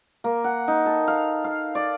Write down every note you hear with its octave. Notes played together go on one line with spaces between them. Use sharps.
A#3
F#5
D#4
A4
F5
F5
D5